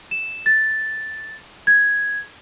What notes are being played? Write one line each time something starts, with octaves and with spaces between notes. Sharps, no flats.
E7
A6
G#6